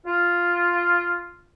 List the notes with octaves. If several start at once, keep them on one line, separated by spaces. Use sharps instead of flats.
F4